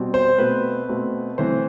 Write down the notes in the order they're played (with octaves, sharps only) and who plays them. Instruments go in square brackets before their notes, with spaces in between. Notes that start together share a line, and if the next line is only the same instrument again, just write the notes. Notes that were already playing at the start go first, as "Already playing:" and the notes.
Already playing: [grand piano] B2 G3 C4
C5
B2 A3 C4 B4
B2 A3 C4
E3 A3 C4 C5